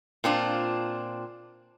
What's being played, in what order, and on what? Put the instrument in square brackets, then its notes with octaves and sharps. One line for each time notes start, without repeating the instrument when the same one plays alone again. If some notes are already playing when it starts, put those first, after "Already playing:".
[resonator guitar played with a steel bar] A#2 C4 D4 F4